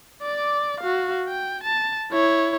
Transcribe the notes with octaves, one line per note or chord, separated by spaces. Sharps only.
D5 D6
F#4 F5
G5
A5
E4 C#5